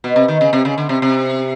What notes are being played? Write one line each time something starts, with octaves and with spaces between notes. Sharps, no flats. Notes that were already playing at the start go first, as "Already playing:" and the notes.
B2
C3
D#3
C#3
C3
C#3
D3
C3
C3